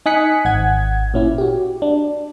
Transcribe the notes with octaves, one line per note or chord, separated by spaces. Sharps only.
D#4 G#5 D#6 F#6 B6 C#7
G#1 F#5 G#6
A#2 C#4 E4
F#4 G4
D4